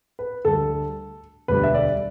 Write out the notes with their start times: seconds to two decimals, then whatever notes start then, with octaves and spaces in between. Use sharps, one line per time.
0.19 B4
0.45 D2 D3 G3 A4
1.48 E1 D2 D3 G3 B4
1.64 E5
1.75 D5